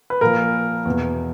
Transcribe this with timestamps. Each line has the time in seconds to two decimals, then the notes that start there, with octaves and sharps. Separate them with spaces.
0.10 B4
0.21 A#2 F3 A#4
0.85 E2 B2